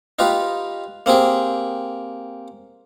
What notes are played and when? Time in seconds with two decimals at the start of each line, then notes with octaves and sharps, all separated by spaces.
0.19 D#4 F4 G4 B4
1.06 A#3 C4 G4 G#4